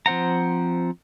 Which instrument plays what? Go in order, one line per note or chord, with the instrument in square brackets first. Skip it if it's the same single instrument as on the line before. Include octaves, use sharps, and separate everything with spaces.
[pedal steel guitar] F3 C4 C5 F#5 A#5